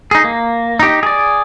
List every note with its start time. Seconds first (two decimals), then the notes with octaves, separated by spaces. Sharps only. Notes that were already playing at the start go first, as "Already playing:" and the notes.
0.11 D#4 G#4
0.24 A#3
0.79 D#4 G4
1.03 G#4 D5